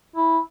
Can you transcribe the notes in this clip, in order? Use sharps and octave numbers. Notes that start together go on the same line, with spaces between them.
E4